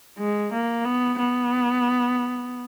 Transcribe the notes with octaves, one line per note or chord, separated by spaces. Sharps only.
G#3
A#3
B3
B3